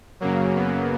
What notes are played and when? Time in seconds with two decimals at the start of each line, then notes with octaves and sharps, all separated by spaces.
0.20 F#2 C#3 F#3 A#3
0.56 B3